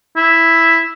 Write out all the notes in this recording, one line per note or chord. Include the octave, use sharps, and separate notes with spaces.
E4